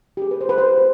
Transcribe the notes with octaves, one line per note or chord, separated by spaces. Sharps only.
G4
G#4
B4
C5
B4
C5
B4
B4